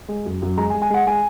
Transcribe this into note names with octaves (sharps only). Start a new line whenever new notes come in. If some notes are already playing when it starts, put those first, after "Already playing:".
G#3
F#2
F#2
G#3 A#5
G#5
G#3
G#5
G#3 F#5
G#3 G#5